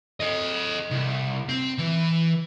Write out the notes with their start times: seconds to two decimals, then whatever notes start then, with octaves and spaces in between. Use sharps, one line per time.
0.20 A4 D#5
0.91 C2
1.49 C4
1.78 E3